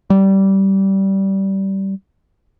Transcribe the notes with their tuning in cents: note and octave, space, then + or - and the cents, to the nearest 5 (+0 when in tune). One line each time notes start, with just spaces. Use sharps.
G3 -15